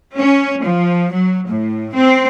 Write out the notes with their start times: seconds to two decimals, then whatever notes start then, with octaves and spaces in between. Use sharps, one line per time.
0.17 C#4
0.64 F3
1.12 F#3
1.48 A2
1.94 C4